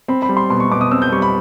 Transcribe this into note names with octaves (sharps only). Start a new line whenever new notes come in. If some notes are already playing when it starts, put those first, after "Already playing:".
C4 B5
B5
G3
C6
B2 C6
C#6
B2 D6
D#6
C4 E6
G6
G3 C#6
B5